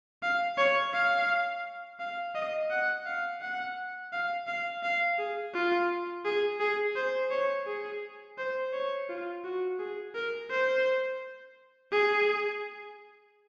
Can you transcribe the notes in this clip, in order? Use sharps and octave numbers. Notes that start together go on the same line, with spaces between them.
F5
C#5
F5
F5
D#5
F#5
F5
F#5
F5
F5
F5
G#4
F4
G#4
G#4
C5
C#5
G#4
C5
C#5
F4
F#4
G#4
A#4
C5
G#4